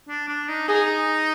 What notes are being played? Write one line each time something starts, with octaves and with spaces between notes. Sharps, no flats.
D4
D4
D#4
D#4 G#4